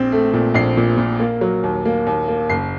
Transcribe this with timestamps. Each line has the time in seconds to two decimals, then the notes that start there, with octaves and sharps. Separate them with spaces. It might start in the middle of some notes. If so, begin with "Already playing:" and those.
Already playing: A#1 C4
0.12 A3
0.34 A#2
0.54 A#1 C7
0.77 A#2
0.98 A#2
1.20 A#3
1.41 F#3
1.63 D#2
1.85 A#3
2.07 D#2
2.28 A#3
2.50 F#1 C7